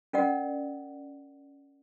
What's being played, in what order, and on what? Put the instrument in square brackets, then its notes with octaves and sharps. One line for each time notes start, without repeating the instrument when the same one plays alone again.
[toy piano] C#4 A#4 D5 F#5